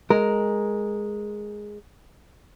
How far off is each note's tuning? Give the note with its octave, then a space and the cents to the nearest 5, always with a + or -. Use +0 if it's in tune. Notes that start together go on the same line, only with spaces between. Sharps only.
G#3 +0 A#4 +0